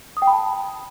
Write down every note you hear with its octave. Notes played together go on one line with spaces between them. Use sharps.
D#6
G5
B5
A5